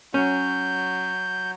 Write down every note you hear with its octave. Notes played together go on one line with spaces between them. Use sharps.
F#3 C#4 G6